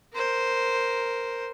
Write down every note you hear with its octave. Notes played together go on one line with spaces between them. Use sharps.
A#4 C5